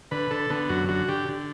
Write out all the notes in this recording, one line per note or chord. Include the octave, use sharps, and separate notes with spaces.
D3 B4
D3 A4
D3 B3
F#2 F#4
D3 F#4
D3 G4
D3